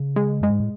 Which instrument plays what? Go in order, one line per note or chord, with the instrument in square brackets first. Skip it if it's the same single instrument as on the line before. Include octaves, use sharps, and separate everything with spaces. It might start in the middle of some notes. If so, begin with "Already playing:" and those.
Already playing: [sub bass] C#3
[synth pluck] G#3
[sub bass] F#2 [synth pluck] G#3
[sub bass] G#2
A2